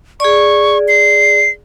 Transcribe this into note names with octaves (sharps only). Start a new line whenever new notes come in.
G#4 D5 C#6
C7